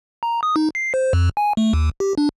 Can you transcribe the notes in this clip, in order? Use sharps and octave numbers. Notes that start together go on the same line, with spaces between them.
A#5
D#6
D#4
C7
C5
F2
G#5
A3
D#2
G4
D4